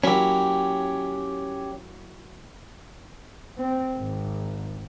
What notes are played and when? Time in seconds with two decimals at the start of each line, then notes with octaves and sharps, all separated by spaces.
0.04 F#3 A#3 C#4 E4 G4
3.58 C4
3.97 G#1